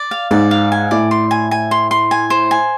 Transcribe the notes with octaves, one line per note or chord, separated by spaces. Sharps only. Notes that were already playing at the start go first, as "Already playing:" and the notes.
Already playing: D5
F5
G#2 D5
F5
G#5
A2 D5
C6
G#5
G#5
C6
C6
G#5
C5
G#5